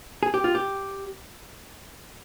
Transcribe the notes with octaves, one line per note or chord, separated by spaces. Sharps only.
G#4
G4
F4
G4